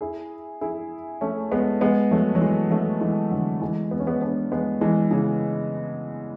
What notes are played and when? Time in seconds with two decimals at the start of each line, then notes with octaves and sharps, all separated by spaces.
0.01 E4 G#4
0.61 E4 G#4
1.21 A3 C#4
1.51 G#3 B3
1.81 G#3 B3
2.11 F#3 A3
2.35 F#3
2.41 E3 G#3
2.71 F#3 A3
3.01 E3 G#3
3.31 D3 F#3
3.61 E3 G#3
3.91 B3
4.00 C#4
4.07 G#3 B3
4.21 B3 D4
4.52 G#3 B3
4.81 E3 G#3
5.11 C#3 E3